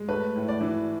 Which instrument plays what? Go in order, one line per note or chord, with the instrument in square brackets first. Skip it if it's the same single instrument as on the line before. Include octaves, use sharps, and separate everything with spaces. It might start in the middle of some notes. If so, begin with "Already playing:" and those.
Already playing: [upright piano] G#3
A3 B4
A2
D5
E3